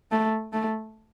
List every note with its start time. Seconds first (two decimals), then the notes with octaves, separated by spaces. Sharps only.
0.12 A3
0.53 A3